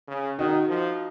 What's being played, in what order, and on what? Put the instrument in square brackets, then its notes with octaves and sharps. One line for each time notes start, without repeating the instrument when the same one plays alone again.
[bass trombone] C#3
[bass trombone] D#3 [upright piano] D#4 F#4
[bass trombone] F3